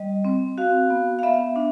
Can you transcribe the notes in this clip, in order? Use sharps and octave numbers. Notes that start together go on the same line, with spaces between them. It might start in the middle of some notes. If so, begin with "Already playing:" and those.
Already playing: G3 D#5
C4
F#4 F5
B3
F5
B3 E5
D4